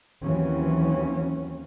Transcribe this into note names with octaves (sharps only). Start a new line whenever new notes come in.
D#2 E3 F#3 C4 C#4